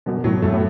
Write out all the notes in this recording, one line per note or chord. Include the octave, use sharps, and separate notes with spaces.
F#2 B2
A2 F#3
F#2 A3
A2